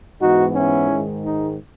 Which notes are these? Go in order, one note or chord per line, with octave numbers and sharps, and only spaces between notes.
G#2 E3 B3 D#4 F#4
C#4 E4
G#2 D#3 G#3
D#4